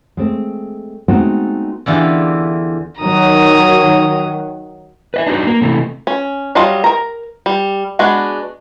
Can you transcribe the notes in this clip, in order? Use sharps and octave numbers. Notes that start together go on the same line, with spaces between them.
G#3 A3 C4
G#3 A3 B3 C4 D#4 F#4
E2 D3 E3 F4 G4
D#3 F#3 A#5 D#6
B4 D#5 E5
D4 D#4 F#4 B4
A#3
C3 E3 A3
C#4
F#3 G3 F4 D#5 A5
A#4 A#5
G3
G#3 B3 D4 F#4